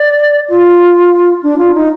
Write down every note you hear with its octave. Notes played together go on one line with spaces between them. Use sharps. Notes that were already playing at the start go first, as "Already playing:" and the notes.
Already playing: D5
F4
D4
F4
D#4